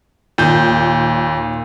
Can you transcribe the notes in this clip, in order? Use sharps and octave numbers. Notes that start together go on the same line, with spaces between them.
D#2 A#2 G6